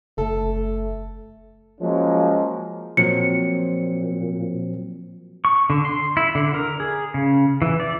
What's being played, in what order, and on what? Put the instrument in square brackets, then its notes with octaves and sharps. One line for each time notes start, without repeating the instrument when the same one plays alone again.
[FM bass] F#1 [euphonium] A3 [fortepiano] A4
[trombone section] F3 F#3 G#3 A#3 C#4
[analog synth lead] A#2 [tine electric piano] F3 F#3 C4 [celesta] C#7
[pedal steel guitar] C#6
D3
C6
E4
D3
A#4
G#4
C#3
E3
D5